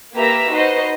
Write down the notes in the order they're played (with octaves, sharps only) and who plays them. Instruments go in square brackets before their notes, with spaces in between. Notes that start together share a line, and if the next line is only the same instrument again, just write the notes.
[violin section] A#3 G4 B4 E5 A#5 E6
D#4 F#4 B4 C5 D#5